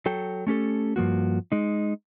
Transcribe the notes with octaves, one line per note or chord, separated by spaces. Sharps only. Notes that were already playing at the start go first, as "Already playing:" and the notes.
F#3 A4 G5
A3 C#4 G4 A4
G2 F3 A#3 F#4
G#3 D#4